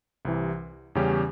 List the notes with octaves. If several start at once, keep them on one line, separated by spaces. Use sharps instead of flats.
C2 C3 E3
E2 C#3 G3 C#4 G4